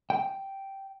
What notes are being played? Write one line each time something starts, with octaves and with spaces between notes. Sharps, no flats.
G5